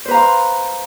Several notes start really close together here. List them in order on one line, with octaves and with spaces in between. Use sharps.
C5 B4 A#5 F5 C6